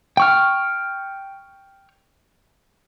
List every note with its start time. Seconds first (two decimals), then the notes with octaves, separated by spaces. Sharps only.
0.17 G5 C#6 F6